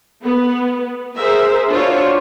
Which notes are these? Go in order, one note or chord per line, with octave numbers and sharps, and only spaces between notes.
B3
G#4 A#4 C5 E5
D4 F4 F#4 C5 C#5